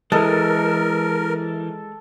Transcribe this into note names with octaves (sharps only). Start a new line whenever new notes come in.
E3 G#3 A4 A#4